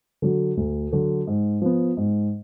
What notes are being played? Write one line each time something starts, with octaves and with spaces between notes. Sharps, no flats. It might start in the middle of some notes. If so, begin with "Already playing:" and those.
D3 F#3
D2
D3 F#3
G#2
F3 B3
G#2